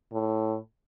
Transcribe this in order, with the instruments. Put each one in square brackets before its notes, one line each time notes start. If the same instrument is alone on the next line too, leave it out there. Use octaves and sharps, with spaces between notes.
[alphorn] A2